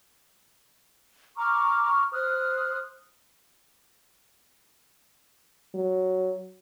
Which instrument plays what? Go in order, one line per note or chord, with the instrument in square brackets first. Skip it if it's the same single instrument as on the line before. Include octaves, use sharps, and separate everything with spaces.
[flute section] A#5 C#6 D6 F6
C5 D#6 F6 F#6
[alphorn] F#3